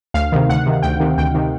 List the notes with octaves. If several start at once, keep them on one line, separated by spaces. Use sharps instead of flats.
D2 F5
C3 D#3
D2 F#5
C3 D#3
D2 G5
C3 D#3
D2 G5
C3 D#3